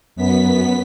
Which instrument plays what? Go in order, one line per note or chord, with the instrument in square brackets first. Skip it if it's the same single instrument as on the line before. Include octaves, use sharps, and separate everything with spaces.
[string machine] F#2 B3 B6